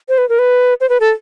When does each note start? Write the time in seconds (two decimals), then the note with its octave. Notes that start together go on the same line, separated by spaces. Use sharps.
0.09 C5
0.18 B4
0.29 A#4
0.39 B4
0.81 C5
0.89 B4
1.00 A4